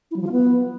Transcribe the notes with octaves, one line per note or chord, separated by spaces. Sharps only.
E4
F#3
F3
F4
B3